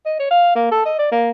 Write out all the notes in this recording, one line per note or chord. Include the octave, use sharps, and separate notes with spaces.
D#5
C#5
F5
A#3
A4
D#5
D5
A#3